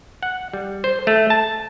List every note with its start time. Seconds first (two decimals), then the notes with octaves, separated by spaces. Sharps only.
0.23 F#5
0.53 G3
0.84 C5
1.07 A3
1.30 A5